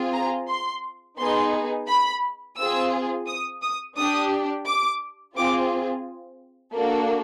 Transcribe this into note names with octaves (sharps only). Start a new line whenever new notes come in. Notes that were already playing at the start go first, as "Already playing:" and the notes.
Already playing: C4 F4 G#4
A#5
C6
B3 D#4 G#4 C6
B5
C4 F4 G#4 E6
D#6
D#6
D4 G4 D#6
D6
C4 F4 G#4 D6
A#3 D4 F#4 A4